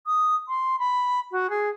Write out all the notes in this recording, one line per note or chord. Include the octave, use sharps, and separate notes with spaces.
D#6
C6
B5
F#4
G#4